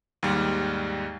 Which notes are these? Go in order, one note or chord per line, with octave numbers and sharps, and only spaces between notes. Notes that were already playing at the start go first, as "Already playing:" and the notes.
D#2 G#2 G3